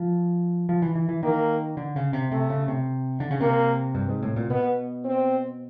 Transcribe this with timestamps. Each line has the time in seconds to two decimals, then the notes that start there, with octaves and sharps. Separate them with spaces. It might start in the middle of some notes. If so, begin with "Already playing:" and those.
Already playing: F3
0.69 F3
0.82 E3
0.95 E3
1.09 E3
1.23 D#3 A#3
1.77 D3
1.96 C#3
2.13 C3
2.31 C3 A3
2.50 C#3
2.68 C3
3.20 D3
3.31 C#3
3.41 C3 A#3
3.95 G2
4.09 G#2
4.23 A2
4.36 A#2
4.50 B2 B3
5.05 C4